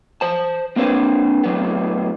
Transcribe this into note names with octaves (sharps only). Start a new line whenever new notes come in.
C5 A5
A#3 C4 D4 B4 C#5
A2 F#3 B3